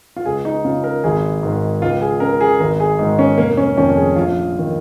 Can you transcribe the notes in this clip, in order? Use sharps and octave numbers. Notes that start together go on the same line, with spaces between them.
F4
C#2 G#4
D#4
C#3 F4
A#4
G#1 G#4
G#2 D#3
C#2 F4
G#4
C#3 A#4
G#4
G#1 A#4
G#4
G#2 D#3 D#4
C#4
F1 A#3
C#4
F2 D#3 C#4
G#4
A#1 F4
D#3